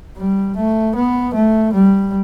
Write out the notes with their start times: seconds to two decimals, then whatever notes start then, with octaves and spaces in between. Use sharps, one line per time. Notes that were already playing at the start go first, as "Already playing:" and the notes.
0.17 G3
0.57 A3
0.95 B3
1.34 A3
1.73 G3